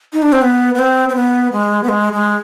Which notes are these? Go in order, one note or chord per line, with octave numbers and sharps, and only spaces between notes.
D#4
D4
C4
B3
B3
C4
C4
B3
G#3
B3
G#3
G#3